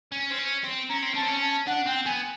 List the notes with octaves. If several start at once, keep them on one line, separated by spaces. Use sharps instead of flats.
C#4
C4
C#4
C4
C#4 A#5
C4
C#4 A5
C4
C#4
A5
D4 F#5
C4 G5
B3 G#5